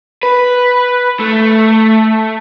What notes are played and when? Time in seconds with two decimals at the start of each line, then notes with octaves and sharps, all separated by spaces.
0.23 B4
1.20 A3